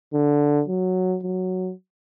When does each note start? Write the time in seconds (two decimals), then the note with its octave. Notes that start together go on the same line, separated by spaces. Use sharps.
0.14 D3
0.68 F#3
1.23 F#3